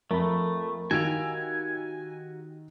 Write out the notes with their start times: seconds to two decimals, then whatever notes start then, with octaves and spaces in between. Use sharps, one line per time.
0.11 F2 A3 A#4 B5
0.91 D#3 F#4 G4 F5 G#5 E6 D7